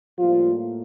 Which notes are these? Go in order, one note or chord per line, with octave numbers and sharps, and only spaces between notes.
A2 F3 G3 A#3 F4